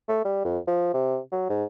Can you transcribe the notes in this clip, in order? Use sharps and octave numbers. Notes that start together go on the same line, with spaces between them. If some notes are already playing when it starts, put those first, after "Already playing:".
A3
G3
F2
F3
C3
F#3
G#2